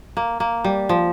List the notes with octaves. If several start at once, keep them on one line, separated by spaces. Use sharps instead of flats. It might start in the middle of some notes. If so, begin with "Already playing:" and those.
A#3
A#3
G3
F3